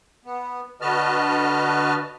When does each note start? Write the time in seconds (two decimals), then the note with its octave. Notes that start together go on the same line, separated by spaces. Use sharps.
0.25 B3
0.81 D3 F#4 B4 D#5 A5 F6